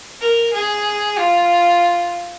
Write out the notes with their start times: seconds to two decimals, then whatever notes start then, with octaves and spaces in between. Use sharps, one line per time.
0.21 A#4
0.53 G#4
1.18 F4